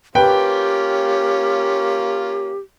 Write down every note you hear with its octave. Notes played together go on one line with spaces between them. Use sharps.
A#3 C#4 F4 G4 B4 G5